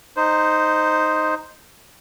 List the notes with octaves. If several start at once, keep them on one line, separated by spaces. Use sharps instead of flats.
D#4 C5